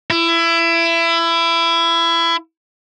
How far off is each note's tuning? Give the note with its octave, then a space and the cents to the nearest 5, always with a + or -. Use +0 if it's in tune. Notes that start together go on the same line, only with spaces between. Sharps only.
E4 +25